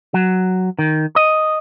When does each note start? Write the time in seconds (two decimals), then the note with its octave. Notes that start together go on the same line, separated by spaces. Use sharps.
0.14 F#3
0.79 D#3
1.16 D#5